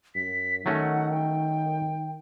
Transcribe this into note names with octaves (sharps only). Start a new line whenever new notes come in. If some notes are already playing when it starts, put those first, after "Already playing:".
F#2 B6
D#3 F#3 A3 C#4 F#5
G5